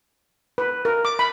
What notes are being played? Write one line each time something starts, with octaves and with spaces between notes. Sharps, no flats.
B4
A#4
D6
B5